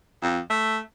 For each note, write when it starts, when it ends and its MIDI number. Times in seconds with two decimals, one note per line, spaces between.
0.23 0.39 41
0.50 0.79 57